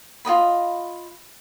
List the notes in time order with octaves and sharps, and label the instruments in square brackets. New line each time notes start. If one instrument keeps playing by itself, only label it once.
[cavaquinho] F4 F#4 D#5 B5